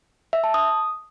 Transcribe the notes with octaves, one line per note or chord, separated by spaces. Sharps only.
E5
A5
D#6